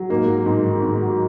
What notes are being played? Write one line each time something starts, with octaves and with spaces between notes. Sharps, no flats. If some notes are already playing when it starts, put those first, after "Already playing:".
Already playing: F#3
G#2 A#3
F#3
G#2
D#3
G#2
F#3